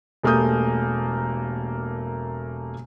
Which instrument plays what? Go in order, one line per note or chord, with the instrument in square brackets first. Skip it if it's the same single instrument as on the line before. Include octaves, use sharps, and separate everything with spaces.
[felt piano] E1 A3 A#3 G4 D#6 G6